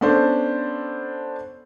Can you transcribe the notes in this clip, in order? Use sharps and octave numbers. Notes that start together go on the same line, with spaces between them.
B3 C#4 D4 A4 C5